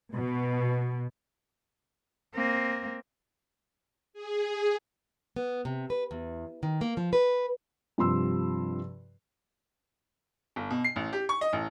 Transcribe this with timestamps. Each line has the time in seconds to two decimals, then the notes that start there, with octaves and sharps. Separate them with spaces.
0.15 B2
2.34 A#3 C4
4.13 G#4
5.36 B3
5.65 C3
5.90 B4
6.11 E2
6.63 D#3
6.81 A#3
6.97 F3
7.13 B4
7.98 G2 C3 F3 C6 E6
10.56 G1
10.70 B2
10.84 C7
10.96 A1
11.13 G4
11.29 C#6
11.41 D#5
11.53 A1